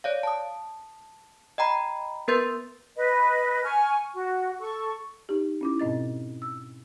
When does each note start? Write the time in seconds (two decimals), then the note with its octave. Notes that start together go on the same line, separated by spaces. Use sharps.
0.04 C#5 D5 F5
0.23 A5 D#6
1.58 D#5 G5 A#5 B5
2.28 B3 A#4 B4 C6 G6 A6
2.97 B4 D#5
3.64 G#5 C#6 F6
4.14 F#4
4.59 A4 C#6
5.29 D#4 G4
5.61 C#4 E4 D6
5.79 G#2 B2 C4 D#5 A6
6.42 E6